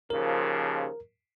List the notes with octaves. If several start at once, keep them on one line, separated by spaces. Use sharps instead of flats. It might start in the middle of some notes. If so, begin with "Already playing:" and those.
D#2 C#3 F3 A#4